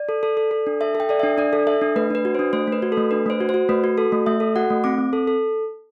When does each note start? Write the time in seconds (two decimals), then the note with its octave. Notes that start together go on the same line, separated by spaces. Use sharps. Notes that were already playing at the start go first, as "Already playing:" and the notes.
Already playing: D5
0.09 A4
0.23 A4
0.37 A4
0.51 A4
0.67 D4
0.81 A4 E5
0.95 A4
1.00 G5
1.09 A4 D5
1.20 D4 E5
1.38 D4 D5
1.53 A4
1.67 A4 E5
1.81 D4
1.96 A3 B4
2.10 D4 B4
2.25 F#4
2.35 D4 C5
2.53 A3 C5
2.67 A3
2.72 B4
2.82 F#4
2.92 A4
2.97 A3
3.11 D4 B4
3.26 A3 C5
3.40 F#4
3.49 C5
3.54 F#4
3.69 A3 B4
3.84 F#4
3.97 F#4 A4
4.12 A3
4.26 A3 E5
4.40 A4
4.56 F#4 F#5
4.70 A3
4.84 C4 D6
4.98 C4
5.13 A4
5.27 A4